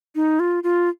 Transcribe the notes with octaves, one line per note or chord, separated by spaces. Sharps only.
D#4
F4
F4